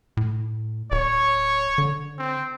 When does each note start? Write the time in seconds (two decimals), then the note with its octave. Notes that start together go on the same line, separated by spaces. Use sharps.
0.17 A2
0.92 D1 C#5
1.78 D3
2.19 C4